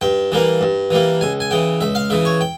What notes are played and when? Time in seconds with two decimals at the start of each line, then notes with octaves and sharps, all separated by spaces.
0.01 G2 G5
0.32 E3 G3 A#3
0.61 G2
0.91 E3 G3 A#3
1.21 C#2 G#5
1.40 G#5
1.51 C#3 E3 G5
1.81 C#2 E5
1.95 F5
2.10 C#3 E3 E5
2.25 C#5
2.41 G5